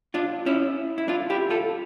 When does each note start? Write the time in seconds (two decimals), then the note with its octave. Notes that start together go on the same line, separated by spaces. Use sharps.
0.14 D4 F4
0.46 C#4 E4
0.98 E4
1.08 D4 F4
1.30 E4 G4
1.50 F4 A4